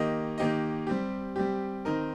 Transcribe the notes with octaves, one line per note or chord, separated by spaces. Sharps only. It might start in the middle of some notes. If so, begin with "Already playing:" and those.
Already playing: D#3 A#3 G4 D#5
D#3 A#3 G4 D#5
G3 C4 G4
G3 C4 G4
D#3 C4 D#4 A#4